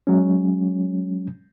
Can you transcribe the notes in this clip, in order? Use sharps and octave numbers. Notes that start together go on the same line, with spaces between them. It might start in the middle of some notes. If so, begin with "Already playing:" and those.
F#3 G#3 C#4